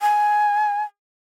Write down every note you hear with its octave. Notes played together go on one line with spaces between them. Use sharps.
G#5